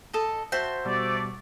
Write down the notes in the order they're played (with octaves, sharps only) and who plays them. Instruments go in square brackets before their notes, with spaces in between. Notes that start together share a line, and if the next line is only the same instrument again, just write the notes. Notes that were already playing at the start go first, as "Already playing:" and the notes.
[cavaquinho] A4 D#5 A5
[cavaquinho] F#4 [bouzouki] C5 E5 A5
[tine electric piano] B2 G3 [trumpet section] A3 D5